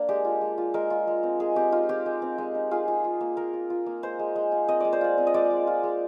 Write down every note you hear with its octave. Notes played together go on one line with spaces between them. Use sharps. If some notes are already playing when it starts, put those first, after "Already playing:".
Already playing: A#3 D4
G#3 G4
F4
G#3
F4
G#3 A#4
F4
G#3
C4
G#3 G#4
C4 G4
D#4 F4
C4 G4
G#3
C4
G#3
D#4
F4 G#4
F4
F4
A#3
A#3 A#4
F4
F4
A#3
G#3 C5
G#3
G#3
F4
C4 D#5
G#3 D5
C5
F4 D5
C4
D#5
G#3 D5
G#3
F4
G#3